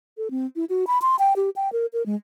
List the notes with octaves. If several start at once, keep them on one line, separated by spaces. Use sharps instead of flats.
A4
C4
E4
F#4
B5
C6
G5
G4
G5
A#4
A#4
G#3